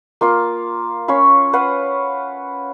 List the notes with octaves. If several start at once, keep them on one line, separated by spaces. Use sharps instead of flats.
A#3 F4 F5
C#4 C#5 F5 B5
B4 F5 F#5